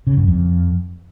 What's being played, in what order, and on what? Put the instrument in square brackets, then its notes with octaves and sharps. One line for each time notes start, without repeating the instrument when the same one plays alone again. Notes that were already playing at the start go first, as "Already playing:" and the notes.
[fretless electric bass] C#3
F#2
F2